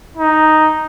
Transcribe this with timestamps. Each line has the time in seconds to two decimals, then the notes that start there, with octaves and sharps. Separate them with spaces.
0.17 D#4